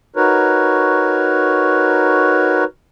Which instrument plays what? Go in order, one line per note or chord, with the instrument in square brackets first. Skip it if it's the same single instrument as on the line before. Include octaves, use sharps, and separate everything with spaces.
[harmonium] D#4 F#4 A#4 B4 C#5